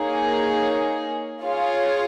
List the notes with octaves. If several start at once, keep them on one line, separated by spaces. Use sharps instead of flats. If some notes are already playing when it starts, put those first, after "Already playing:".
Already playing: A#3 D#4 G#4 C#5
F4 G#4 C#5 F5